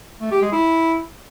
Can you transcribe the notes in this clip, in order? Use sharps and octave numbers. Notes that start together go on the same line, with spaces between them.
A3
G4
G#3
E4